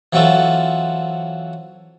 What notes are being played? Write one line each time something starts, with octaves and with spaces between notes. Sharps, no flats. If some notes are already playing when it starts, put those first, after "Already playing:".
E3 F#3 C4 F4 F#4 A4